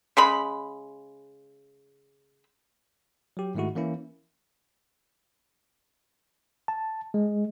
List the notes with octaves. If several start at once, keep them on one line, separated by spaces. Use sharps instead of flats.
C#3 G#3 B5
F#3 G4
G#2 D#3 G#3 A3 E4 F#4
E3 A#3 C#4 E4
A5
G#3